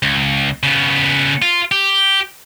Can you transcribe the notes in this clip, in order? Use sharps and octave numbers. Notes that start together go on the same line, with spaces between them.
C#2
C#3 B3
F4
G4